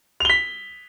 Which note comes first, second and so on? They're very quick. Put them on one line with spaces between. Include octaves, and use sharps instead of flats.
F7 G7 B6